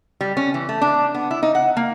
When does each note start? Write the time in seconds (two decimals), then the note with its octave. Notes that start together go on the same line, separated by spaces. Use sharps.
0.21 G3
0.37 C#4
0.54 E3
0.69 A3
0.82 D4
1.14 B3
1.31 E4
1.43 D#4
1.55 F#5
1.77 A#3